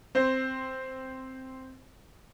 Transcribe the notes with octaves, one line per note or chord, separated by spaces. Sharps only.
C4 C5